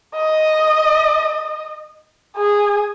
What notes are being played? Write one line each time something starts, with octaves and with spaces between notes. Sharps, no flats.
D#5
G#4